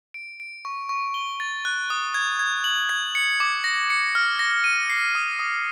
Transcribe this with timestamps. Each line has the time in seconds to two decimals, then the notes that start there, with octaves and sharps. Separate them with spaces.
0.14 D7
0.40 D7
0.65 C#6
0.89 C#6
1.14 G7
1.40 A6
1.65 F#6
1.90 D#6
2.14 G#6
2.39 G#6
2.64 F#7
2.89 G#6
3.15 C#7
3.40 D6
3.64 A#6
3.90 C#7
4.15 F6
4.39 A#6
4.64 D#7
4.90 C7
5.15 D#6
5.39 D#6